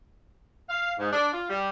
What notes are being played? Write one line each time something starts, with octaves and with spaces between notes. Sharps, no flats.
F5
G#2
D4
F4
G3